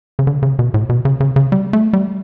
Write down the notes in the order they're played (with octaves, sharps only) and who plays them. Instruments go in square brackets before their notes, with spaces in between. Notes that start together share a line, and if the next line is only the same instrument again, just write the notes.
[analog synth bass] C#3
D3
C#3
B2
A2
B2
C#3
C#3
C#3
G3
A3
G3